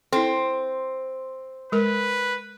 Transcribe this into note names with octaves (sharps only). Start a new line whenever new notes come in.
C4 E4 A4
G#3 A#4 B4